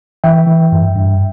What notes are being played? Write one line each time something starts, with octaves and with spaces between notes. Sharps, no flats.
E3 E5 G5
E3
G2
G2